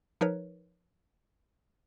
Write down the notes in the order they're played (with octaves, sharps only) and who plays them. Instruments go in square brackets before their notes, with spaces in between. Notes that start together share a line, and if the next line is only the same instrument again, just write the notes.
[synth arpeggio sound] F3 D#4 A#4 B4 C#5